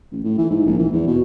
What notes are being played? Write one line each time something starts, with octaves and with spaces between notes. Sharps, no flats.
A1
A2
E3
G#2
A#1
E3
E2
B2